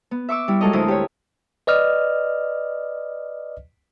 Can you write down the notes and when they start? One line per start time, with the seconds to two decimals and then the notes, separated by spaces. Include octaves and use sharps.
0.11 B3
0.29 E5 C#6 D6 E6
0.48 G3 E4
0.61 F#3 G#3 F4 A4 A#4 D#5
0.73 D2 E4 C5 D#6
0.88 G4 C#5
1.67 B4 D5 D#5 F6